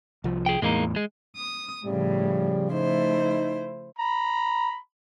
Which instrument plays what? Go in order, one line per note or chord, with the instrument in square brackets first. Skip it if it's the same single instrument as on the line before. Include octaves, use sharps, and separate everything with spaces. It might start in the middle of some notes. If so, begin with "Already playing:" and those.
[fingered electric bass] C2 F3
[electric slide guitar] G#4 G5
[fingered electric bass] E2 A2 [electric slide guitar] G#3 A#3 D#4
[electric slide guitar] G#3
[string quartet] D#6
[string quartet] A2 [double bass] C#3 F3 [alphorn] G3
[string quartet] A3 E4 C5 [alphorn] D#4
[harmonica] A#5 B5